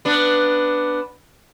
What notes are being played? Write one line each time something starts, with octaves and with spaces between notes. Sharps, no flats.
B3 D4